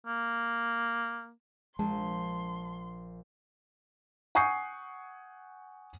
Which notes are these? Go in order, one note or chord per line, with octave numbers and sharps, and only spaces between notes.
A#3
A#1 G#3 A5 C6
F#5 G#5 C#6 D#6 G6 C7